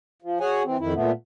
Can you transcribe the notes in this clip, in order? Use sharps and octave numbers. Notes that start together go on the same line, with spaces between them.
F3
F#4 G#4 C#5 F#5 G#5
E3 C4
F2 D#3 E4
A#2 A3 B3